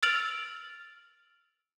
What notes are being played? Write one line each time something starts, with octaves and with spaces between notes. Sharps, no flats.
E6 F6 A6 D7 F7 F#7